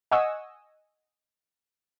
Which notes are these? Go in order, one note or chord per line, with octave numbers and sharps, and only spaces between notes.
D#5 F#5 G#5 C#6 D#6 E6